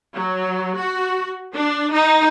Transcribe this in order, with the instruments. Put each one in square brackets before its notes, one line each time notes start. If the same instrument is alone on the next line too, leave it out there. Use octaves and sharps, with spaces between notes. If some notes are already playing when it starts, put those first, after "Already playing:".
[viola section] F#3
F#4
D4
D#4